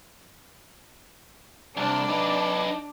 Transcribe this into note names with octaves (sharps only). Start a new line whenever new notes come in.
C2 D4
D#4 B4